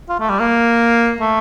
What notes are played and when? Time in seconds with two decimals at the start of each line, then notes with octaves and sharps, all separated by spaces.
0.09 F4
0.20 A3
0.30 G3
0.39 A#3
1.20 A3